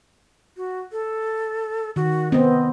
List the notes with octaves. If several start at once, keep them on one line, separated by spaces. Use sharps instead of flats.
F#4
A4
D#3 F#4
B3 C4 D#5